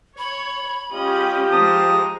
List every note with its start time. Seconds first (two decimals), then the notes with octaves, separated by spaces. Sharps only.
0.18 C#5 B5
0.93 G#3 C#4 F4 G4 D#5
1.52 F3 G#3 A5 A#5 D#6